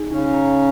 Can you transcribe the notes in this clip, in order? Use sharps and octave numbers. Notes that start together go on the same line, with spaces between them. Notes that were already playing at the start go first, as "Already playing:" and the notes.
Already playing: D#4 G#4
C#3 C#4 D#4
A#5